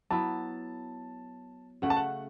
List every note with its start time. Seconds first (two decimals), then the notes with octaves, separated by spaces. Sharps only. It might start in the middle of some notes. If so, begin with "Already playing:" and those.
0.11 F#3 B3 E4 A5
1.82 C#3 A3 F#4 F#5
1.90 A5
1.97 F#5